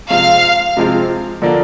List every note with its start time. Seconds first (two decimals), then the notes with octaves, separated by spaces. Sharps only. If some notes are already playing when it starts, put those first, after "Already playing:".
0.10 C3 F3 G#3 C4 F4 F5
0.77 C3 F3 G#3 C4 F4
1.42 D3 F3 A#3 D4